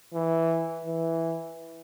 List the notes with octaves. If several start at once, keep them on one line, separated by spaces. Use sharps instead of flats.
E3
E3